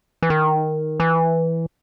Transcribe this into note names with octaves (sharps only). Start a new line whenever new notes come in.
E3
D#3
E3